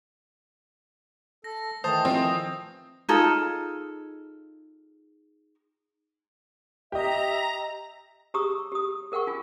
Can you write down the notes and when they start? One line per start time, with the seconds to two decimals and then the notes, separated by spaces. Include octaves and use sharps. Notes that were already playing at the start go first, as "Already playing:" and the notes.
1.44 A4 A#6
1.84 D#3 E3 A3 C5 A5 D#6
2.05 F3 C4
3.09 D#4 F4 G#4 A4
6.92 G4 D#5 E5 A#5
8.34 G4 G#4 A#5 C#6 D#6 E6
8.72 G4 D#6
9.12 G#4 A#4 F#5 G5 C#6
9.27 F4 G#5